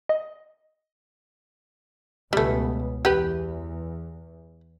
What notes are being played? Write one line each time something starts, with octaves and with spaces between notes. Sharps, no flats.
D#5
C#2 B2 G3 A3 B3
E2 G4 B4